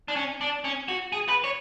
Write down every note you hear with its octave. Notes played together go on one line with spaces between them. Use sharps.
D4
C#4
D4
C#4
F#4
G#4
B4
C#5